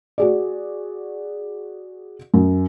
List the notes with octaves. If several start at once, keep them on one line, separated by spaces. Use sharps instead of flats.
F#4 G#4 D5
F#2